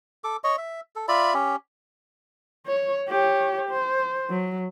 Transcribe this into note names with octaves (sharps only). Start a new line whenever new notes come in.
A4 D6
C#5 D#5 C#6
E5
A4
F4 D5 E5 B5
C#4 G4
C#5
G4 C#5
C5
F#3